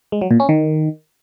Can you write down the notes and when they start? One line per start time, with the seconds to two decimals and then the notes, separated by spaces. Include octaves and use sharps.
0.12 G#3
0.21 F#3
0.31 A#2
0.40 C#4
0.49 D#3